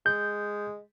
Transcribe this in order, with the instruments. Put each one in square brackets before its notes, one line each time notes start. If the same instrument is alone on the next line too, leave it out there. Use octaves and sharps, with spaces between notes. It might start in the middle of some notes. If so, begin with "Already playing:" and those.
[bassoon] G#3 [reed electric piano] G6